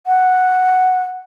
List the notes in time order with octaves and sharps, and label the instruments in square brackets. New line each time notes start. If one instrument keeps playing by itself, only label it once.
[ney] F#5